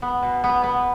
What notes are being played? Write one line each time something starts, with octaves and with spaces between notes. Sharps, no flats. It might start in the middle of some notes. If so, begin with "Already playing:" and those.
B3
B2
B3
B3